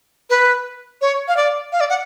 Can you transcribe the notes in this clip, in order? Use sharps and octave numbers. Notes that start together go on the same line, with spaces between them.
B4
C#5
F5
D5
F5
D5
F#5